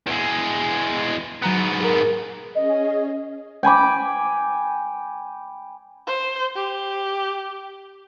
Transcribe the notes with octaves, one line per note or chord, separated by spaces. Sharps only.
E2 G#3
G#2 F#3 B3 A#5 F#6
G#4 A#4
C#4 G#4 D#5
G5 G#5 B5 D6
C5
G4